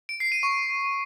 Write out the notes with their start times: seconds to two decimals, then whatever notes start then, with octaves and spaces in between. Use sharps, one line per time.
0.09 D7
0.20 C7
0.32 D#7
0.43 C#6